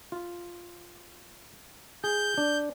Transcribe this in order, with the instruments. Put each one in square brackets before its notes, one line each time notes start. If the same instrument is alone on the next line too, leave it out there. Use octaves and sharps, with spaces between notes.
[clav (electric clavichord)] F4
[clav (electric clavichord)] G#4 [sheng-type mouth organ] G6
[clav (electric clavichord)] D4